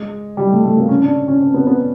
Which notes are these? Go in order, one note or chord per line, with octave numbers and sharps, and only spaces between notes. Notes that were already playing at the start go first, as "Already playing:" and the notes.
Already playing: G#3
G3
A3
A3
A#3
C#4
D4
C#4
C4
B3
B3